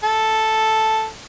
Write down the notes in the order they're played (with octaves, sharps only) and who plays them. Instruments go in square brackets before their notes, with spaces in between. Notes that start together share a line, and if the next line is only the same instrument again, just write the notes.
[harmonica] A4